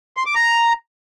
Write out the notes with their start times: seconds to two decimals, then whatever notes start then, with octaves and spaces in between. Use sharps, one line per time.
0.17 C6
0.26 D6
0.35 A#5